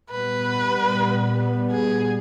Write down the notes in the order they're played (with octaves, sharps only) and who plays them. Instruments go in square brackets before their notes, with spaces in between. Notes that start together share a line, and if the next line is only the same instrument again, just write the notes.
[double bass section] A#2 G3 B3 [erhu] B4
[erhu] G#4